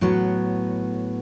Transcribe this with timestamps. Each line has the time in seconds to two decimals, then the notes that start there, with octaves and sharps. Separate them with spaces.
0.01 A2 F#3 B3